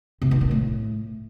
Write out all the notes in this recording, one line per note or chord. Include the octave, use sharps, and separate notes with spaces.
C3
B2
A#2
A2